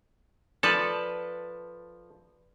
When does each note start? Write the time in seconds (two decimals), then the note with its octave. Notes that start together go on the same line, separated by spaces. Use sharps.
0.63 F3 A4 B4 D5 A5